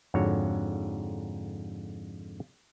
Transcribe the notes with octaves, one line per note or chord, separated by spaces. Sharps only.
F2 G#2 D3 F#4 C#5